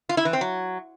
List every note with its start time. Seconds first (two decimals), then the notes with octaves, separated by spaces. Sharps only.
0.09 F4
0.17 E4
0.25 E3
0.33 C4
0.41 F#3